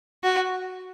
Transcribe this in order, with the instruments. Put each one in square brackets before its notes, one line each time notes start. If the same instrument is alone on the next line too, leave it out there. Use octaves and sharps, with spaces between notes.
[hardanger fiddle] F#4